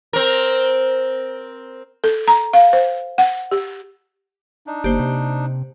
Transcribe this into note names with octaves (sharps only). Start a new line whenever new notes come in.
C4 A#4
A4
A#5
F5
C5
F#5
G4
D4 D#4
G1 A#3 G4 C5
C3